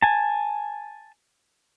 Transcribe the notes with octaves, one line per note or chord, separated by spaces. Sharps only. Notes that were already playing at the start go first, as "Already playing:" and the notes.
G#5 A5